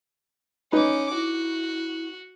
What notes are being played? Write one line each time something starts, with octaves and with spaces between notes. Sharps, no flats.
C#4 D#4 B4 D6
E4 F#4